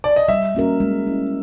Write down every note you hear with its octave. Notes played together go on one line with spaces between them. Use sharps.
D5
D#5
G3 E5
A#3 C#4 F#4 A#4
G#3
C#4 E4